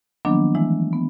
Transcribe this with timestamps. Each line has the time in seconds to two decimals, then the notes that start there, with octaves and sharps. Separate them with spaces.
0.25 D#3 F3 F#3 A#3 B3 D4
0.55 E3 G#3 A3 E4
0.93 B3